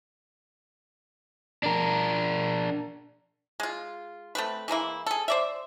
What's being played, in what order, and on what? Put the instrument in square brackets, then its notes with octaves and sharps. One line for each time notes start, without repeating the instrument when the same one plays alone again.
[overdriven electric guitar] D4 A#4
[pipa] G#3 F4
A3 C4 B4
E3 G#3 A#3 E4
G#4 A4
C5 D5 E5